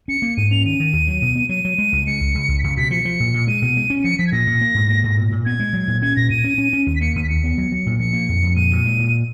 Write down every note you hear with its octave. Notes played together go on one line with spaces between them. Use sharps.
C#4 C#7
A#3
G#2 D#7
C#4 F7
D#3 D#7
D#3
D#2
F#3
B2
B3
F#3 D#7
F#3
G#3
C#2
G#3 C#7
C#2
C#2
C#2
B6
C#2 C#7
B2 B6
F3 C#7
F3
A#2
A#2
G#3 D#7
B2
G#3
C#4
D#7
F3 C#7
F3 B6
G#6
A#2 A#6
A#2
A#3
G#2
A#3
G#2
A#2
A#2
B3 G#6
G#3
F#3
A#2
C#4 G#6
A#2 A#6
A#2 D#7
C#4
C#4
C#4
D#2 D#7
B6
A#3 C#7
D#2 D#7
B6
D#2 C#7
B3
F#3
F#3
A#2
F3 C#7
A#3
F2
F2
A#2 D#7
A#2
G#3
A#2